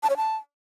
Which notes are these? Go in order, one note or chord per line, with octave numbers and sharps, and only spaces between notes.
A5
C#5
A5